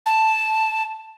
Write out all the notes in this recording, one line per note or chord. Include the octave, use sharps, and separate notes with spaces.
A5